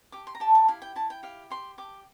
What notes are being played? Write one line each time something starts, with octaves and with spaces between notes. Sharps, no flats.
G4 D6
C6
A#5
G4 A5
A5
E4 F5
G5
E4 A5
G5
G4 F5
G4 C6
G4 D6